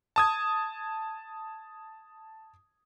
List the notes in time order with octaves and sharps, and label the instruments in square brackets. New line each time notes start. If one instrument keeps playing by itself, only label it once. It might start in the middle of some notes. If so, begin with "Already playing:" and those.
[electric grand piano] A5 D#6 G#6